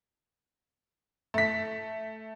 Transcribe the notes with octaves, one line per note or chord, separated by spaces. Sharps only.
A3 B6